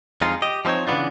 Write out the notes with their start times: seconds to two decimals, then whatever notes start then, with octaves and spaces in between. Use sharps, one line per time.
0.21 F2 G#3 D#4 F4
0.42 G4 D#5
0.65 F3 G3 C4 D#4 C#5
0.87 C#3 E3 G#3 B3 D4 F4